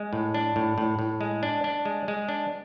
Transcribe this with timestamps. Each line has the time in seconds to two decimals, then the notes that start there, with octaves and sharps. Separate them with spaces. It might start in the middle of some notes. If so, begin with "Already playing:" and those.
Already playing: G#3
0.13 A2
0.34 D4
0.56 A2
0.78 A2
0.99 A2
1.21 G#3
1.43 D4
1.64 D4
1.85 G#3
2.08 G#3
2.29 D4